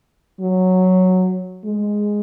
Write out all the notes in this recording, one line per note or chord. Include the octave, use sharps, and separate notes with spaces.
F#3
G#3